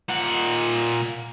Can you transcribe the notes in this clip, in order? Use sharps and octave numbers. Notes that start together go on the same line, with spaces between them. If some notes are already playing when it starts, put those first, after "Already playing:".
A#2 F#5